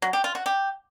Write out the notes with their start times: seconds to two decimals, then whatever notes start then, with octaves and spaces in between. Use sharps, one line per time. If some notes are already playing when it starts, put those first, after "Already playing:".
0.02 F#3
0.13 G4
0.24 F4
0.35 F#4
0.46 G4